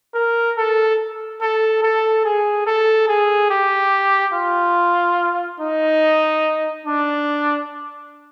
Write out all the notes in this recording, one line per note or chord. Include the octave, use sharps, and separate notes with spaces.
A#4
A4
A4
A4
G#4
A4
G#4
G4
F4
D#4
D4